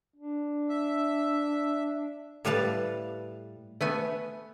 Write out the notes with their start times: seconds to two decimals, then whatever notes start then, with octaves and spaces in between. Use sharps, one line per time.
0.16 D4
0.69 E5
2.45 A2 G3 B4 F5 A5
3.81 A3 B3 G#5